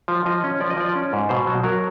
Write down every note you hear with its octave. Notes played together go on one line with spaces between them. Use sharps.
F3
F3 D#5
C#4
F3 D5
D#5
F3 D5
C#4
G#2
B2 C5
F#3
F#3 A#4